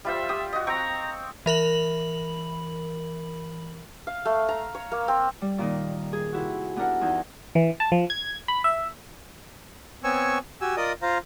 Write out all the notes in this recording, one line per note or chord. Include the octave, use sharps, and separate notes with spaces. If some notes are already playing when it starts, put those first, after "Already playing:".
G3 F4 C5 E5
G4 D#6
F#4 D#5
C4 G5 A#5 C#6
E3 A#4 B5 F#7
F5
A3
A#5
C#5
A#3
C4
G3
A#2 D#3 D#4
G#4
C3 E4 F#4
B3 D4 E4 A#4 F#5
E2 D#4 G6
E3
A5
F3
G#6
B5
E5
B3 C4 C#5 G#5 C#6 E6
F#4 G4 G#5 E6
F4 A#4 D5 D#5 D#6
F4 C5 F5 A#5